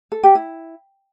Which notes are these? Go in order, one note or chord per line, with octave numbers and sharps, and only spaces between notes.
A4
G4
E4